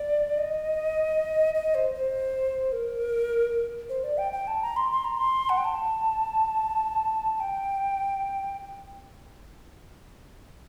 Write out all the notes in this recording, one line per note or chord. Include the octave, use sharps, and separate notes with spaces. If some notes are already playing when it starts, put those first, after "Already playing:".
Already playing: D5
D#5
D#5
C5
C5
A#4
C5
D5
G5
G5
A5
A#5
C6
C6
A#5
C6
F#5
G5
A5
G5